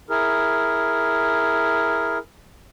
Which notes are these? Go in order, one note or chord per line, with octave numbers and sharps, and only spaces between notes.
E4 G#4 A#4